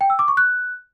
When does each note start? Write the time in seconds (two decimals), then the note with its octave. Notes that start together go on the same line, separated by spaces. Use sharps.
0.01 G5
0.10 E6
0.19 D6
0.28 C#6
0.37 F#6